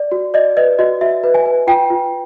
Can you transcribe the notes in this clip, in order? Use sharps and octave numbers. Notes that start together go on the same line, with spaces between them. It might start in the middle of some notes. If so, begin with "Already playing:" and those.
Already playing: D5
F#4
D5 D#5
B4 D#5
F#4 D#5
F#4 E5
B4
G#5
B4
F4 G5
F4